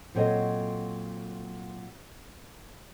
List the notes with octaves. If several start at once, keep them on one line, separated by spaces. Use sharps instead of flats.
A#2 F#3 C4 A4 C#5 D#5